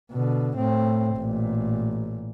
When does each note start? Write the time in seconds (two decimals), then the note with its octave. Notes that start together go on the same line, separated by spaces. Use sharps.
0.11 B2 D3
0.56 A2 C4
1.17 A1 A#2